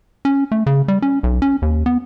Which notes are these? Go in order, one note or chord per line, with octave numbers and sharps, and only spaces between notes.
C#4
A3
C#3
G3
C#4
B1
C#4
D#2
B3